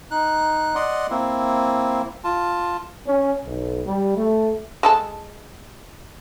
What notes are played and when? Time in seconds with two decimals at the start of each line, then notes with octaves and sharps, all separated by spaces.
0.11 D#4 F#6
0.75 D5 D#5 F#5 C6
1.10 A#3 C4 E4
2.24 F4 A5
3.07 C#4
3.45 B1
3.86 G3
4.16 A3
4.83 G#3 A4 A5